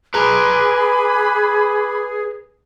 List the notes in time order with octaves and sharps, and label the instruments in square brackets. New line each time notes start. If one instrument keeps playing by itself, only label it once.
[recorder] G#4 [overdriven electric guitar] B4 A#5 [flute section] G#5 B5 D6